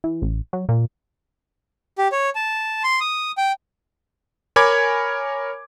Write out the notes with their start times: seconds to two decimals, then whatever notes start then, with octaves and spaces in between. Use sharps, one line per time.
0.04 E3
0.22 A1
0.53 F#3
0.69 A#2
1.98 G4
2.12 C#5
2.35 A5
2.84 C6
3.01 D#6
3.38 G5
4.56 A#4 C#5 G#5 B5 D6 G#6